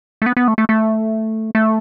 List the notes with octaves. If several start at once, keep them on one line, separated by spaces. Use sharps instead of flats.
A3
B3
B3
A3
A3
A3
A3